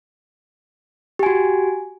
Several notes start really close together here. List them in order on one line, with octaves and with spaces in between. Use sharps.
G4 G#5 F#4